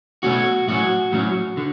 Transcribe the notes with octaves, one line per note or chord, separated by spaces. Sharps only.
B2 A3 C#4 F#4
A2 F#3 C#4 F#4
A2 F#3 C#4
D3